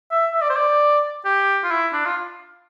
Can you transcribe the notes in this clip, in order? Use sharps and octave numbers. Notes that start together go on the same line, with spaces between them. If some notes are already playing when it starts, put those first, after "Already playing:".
E5
E5
D5
C5
D5
G4
F4
E4
D4
F4